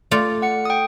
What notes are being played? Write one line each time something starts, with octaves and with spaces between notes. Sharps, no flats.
A3 F4 D5
F#5 C#7
G5 D#6